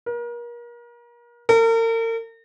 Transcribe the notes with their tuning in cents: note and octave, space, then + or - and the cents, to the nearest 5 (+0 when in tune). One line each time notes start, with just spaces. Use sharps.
A#4 +35
A#4 -40